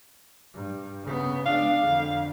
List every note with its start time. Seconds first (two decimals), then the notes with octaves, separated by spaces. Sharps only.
0.54 G2
1.03 C#3 B3
1.46 G#3 D4 F5
1.85 F2 D3